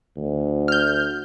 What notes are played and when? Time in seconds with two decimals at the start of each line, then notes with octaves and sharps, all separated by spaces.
0.17 D2
0.68 F6 G6